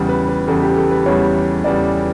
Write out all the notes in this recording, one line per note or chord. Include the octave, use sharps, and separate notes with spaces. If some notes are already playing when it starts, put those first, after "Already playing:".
Already playing: E2 C#3 G3
B4
B4
E2 C#3 G3 A4
G4
A4
B4
E2 C#3 G3 C#5
E2 C#3 G3 D5